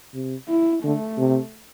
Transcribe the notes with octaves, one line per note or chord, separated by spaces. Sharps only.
C3
E4
D3 A3
C3